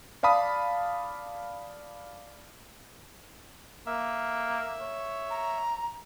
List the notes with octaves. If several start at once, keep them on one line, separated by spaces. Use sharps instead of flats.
D5 F5 A5 B5 D#6
A#3 E5
C#5
A#5